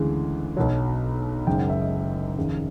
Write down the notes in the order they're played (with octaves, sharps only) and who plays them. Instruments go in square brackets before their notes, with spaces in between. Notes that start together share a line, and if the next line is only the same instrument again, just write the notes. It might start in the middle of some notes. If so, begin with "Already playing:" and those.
Already playing: [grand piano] D2 C#3 E3 G#3
B1 B2 F#3
F#1 F#2 D#3 G#3 G5
F#5
E5
D#5
F1 D#2 C#3